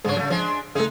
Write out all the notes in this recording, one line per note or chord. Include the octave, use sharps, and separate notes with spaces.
G#2 C#3 D4 C#5
C#3 F#3 A3
F3 G#3 D4
C#3 G#3 A3 D#4 E4